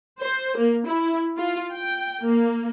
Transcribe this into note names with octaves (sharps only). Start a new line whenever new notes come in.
C5
A#3
E4
F4
G5
A#3